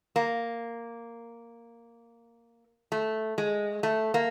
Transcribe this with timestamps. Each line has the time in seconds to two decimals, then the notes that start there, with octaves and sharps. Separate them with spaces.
0.16 A#3
2.92 A3
3.38 G#3
3.83 A3
4.14 A#3